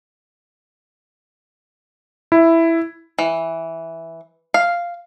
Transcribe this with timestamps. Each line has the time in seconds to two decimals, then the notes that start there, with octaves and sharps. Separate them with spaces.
2.32 E4
3.19 E3
4.54 F5